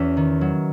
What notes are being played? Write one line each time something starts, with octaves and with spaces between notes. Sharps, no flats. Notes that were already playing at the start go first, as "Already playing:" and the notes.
Already playing: E2 C#4 F#4 E5
D#3
F#3